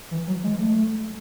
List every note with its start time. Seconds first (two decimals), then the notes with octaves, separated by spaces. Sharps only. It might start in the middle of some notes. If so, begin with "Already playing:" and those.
0.11 E3
0.27 F#3
0.43 G#3
0.59 A3